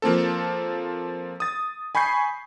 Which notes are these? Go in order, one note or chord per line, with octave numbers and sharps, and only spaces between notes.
F3 A#3 C4 A4
D#6 A6
G#5 B5 C#6 G6 C7